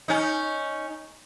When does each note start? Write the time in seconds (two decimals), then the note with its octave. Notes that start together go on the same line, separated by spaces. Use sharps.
0.08 C#4 D#4